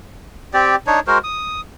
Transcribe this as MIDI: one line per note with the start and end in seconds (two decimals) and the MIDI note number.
0.54 0.76 60
0.54 0.76 67
0.54 0.76 74
0.87 1.00 62
0.87 1.00 63
0.87 1.00 73
1.07 1.18 56
1.07 1.18 66
1.07 1.18 70
1.07 1.18 72
1.24 1.61 87